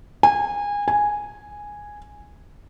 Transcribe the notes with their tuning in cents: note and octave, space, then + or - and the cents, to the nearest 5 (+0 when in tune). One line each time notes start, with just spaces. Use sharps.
G#5 -25
G#5 -5